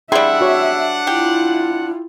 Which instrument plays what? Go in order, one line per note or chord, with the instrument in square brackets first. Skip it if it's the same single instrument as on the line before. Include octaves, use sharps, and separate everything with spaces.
[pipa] G3 E4 [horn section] D4 F#5 [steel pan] G#4 G5 C6 [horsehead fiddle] E5
[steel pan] F#4 C#5
[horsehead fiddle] E4 F4 [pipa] G4